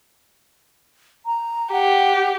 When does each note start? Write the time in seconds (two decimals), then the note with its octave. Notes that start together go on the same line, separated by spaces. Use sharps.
1.26 A#5
1.72 G4 F#5